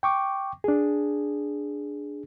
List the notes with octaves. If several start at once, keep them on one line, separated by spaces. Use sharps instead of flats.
G5 C#6 D6
D4 G#4